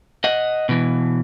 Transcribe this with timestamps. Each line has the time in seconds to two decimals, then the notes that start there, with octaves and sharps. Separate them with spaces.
0.24 D#5 F#5
0.69 B2 E3